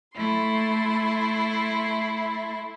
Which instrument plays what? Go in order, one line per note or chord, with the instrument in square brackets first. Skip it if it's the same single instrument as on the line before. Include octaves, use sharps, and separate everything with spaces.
[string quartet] A3 E4 C6